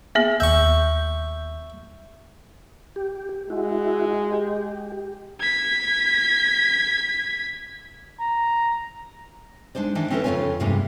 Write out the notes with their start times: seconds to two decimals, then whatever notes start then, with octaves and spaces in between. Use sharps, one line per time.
0.15 A#3 B3 G#4 E5
0.40 D#2 E5 C#6 G6
2.96 G4
3.50 G#3 E4 F#4
4.32 G4
5.40 G#6 B6
8.20 A#5
9.75 G#3 D4 D#4 C5 D5
9.95 D#3 E3 D4 D#4
10.10 C4 C#4 D#4 E4 A4 B4
10.24 F2 C#3 A#3 F4 C#5 G#5
10.60 E2 G2 C3 E3 G#3 A#3